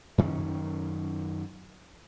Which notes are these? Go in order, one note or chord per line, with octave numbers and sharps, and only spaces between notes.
F#2 D#3 C#4